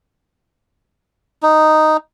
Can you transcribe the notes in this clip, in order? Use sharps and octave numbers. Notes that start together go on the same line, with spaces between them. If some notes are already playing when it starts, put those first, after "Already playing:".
D#4